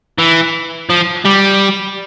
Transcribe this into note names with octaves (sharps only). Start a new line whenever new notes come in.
E3
F3
G3